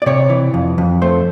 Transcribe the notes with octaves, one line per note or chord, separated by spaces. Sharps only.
D5
C3 C#5
E3
F2
F2
A3 C5